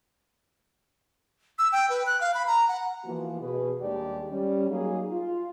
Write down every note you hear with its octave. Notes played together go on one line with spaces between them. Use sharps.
E6
G5
B4
F#6
F5
B5
A#5
F#5
E3 F3 A#3 B3 F#4
B2 G#4 B4
D#2 G3 G#3 D4 G4 D5
G3 C#4
F#3 A#3 D#4 G#4
F4